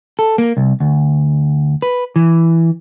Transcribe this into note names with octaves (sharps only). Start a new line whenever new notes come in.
A4
A#3
C2
D2
B4
E3